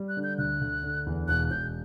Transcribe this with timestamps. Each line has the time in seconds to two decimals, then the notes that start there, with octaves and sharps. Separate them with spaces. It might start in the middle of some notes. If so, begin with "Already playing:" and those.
Already playing: G3
0.09 F#6
0.17 D3
0.23 G6
0.38 D2 F#6
0.61 D2
0.83 D3
1.06 E2
1.28 E1 F#6
1.51 E1 G6